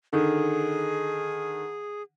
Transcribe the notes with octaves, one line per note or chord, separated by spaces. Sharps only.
D3 D#3 G#4